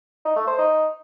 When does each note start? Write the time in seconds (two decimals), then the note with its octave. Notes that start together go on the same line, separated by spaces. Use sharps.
0.25 D#4
0.36 A3
0.47 C5
0.59 D#4